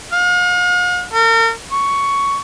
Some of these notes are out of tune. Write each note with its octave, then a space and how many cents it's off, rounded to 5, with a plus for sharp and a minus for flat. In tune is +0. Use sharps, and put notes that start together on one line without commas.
F5 +45
A#4 -40
C#6 +10